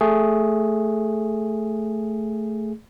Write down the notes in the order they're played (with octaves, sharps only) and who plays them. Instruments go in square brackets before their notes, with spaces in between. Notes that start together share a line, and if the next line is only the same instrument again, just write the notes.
[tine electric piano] A3 G#4